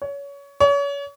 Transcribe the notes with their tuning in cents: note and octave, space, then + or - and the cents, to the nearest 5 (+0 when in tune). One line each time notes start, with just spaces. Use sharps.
C#5 +25
C#5 +35